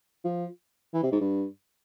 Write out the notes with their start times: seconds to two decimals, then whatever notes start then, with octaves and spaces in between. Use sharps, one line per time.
0.24 F3
0.94 E3
1.03 C3
1.12 G#2
1.20 G2